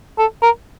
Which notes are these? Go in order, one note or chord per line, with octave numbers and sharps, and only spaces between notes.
A4
A#4